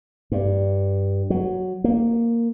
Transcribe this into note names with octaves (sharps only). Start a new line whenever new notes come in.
G2
F#3
A#3